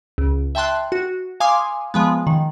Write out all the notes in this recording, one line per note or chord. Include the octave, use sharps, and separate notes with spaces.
C#2
E5 G5 A5 C6 F#6
F#4
F5 G#5 C6 D6 D#6
F3 G#3 B3
D#3